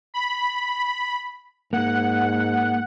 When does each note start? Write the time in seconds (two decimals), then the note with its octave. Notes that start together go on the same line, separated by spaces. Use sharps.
0.14 B5
1.73 G#2 A#3 F#5